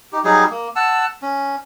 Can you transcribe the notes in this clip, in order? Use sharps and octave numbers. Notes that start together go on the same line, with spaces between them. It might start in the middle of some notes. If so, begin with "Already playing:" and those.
D#4 G4
F#3 G3 D#4 G#4
A#3
F#5 A5 E6
C#4